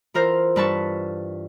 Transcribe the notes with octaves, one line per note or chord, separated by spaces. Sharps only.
E3 F4 A#4 C5
G2 B4 A5 C#6